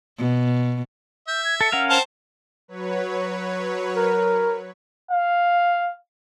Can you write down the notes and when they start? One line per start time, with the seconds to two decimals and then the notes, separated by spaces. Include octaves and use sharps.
0.18 B2
1.28 E5 G6
1.45 G#6
1.61 A4 C#7
1.72 C#4 A#4 F5 F#5
1.90 C4 C5 A5
2.68 F#3 B4 C#5
3.96 A#4
5.11 F5